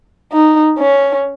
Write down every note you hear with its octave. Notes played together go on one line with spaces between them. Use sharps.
D#4
C#4